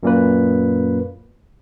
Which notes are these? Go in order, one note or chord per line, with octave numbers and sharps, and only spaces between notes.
F#2 A#2 A#3 B4